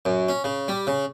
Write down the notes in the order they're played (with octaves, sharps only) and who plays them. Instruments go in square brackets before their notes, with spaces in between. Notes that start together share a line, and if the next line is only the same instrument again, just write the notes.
[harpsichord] F#2
C#4
C#3
G3
C#3